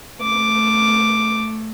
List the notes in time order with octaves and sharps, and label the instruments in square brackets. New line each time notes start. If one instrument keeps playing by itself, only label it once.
[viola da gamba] A3 [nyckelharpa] D6